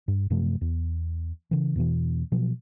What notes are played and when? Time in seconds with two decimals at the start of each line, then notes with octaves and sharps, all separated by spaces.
0.08 G2
0.30 F#2 C3 F3 A3
0.61 E2
1.51 C#3 E3
1.76 E2 B2 E3
2.32 B2 F3 F#3